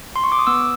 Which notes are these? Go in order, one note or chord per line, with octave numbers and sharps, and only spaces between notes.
C6
C#6
D6
D#6
B3 E6